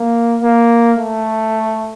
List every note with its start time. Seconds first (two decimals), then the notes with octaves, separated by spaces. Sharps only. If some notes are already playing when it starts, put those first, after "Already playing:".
Already playing: A#3
0.42 A#3
0.98 A3